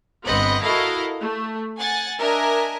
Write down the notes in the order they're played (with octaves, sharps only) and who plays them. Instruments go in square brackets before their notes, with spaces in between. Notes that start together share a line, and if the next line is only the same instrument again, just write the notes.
[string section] G1 B3 C4 D#5 B5 C#7
E4 F#4 A4 A#4 D#5 F5
A3
F#5 G#5 A6
D4 A#4 D#5 E5 G#5